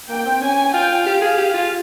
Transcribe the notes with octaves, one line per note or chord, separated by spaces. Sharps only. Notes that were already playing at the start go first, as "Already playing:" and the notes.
A#3 G5
C4
C#4 G#5
F4 G5
G4 F5
G#4
G4
F4